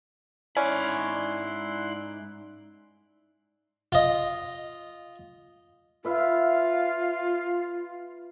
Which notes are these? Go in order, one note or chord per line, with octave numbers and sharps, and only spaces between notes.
G#2 C#4 E4 D5 B5 C6 F#6
F4 D#5
F4 B4 E5 F5